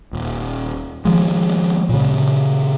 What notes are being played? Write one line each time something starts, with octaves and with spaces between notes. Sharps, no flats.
D#1
D#3 F3 G#3
A#2 C#3